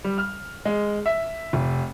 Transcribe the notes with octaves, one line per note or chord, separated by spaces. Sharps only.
G3
F6
G#3
E5
F1